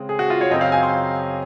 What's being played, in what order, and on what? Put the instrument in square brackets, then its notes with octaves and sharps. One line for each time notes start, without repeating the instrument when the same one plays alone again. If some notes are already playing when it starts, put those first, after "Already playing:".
Already playing: [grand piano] C#3 G#3 C4
G#4
F#4
F4
C#5
F#2 C#3 F#3 C4 D#5
F5
G#5
C6